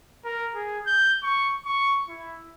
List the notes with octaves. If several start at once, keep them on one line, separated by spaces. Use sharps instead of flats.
A#4
G#4
G6
C#6
C#6
E4